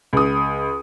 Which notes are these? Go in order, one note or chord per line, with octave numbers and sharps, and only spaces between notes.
C#2 D#6